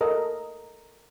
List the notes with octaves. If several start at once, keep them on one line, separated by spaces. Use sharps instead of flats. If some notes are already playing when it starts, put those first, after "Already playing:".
A4 A#4 D#5